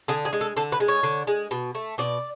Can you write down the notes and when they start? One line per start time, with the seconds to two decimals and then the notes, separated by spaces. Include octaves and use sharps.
0.08 D3 G#4
0.25 G#4
0.33 G#3
0.41 A4
0.57 D3 A4
0.72 B4
0.80 G#3
0.88 C#5
1.03 D3
1.27 G#3
1.51 B2
1.75 A3
1.98 B2 D5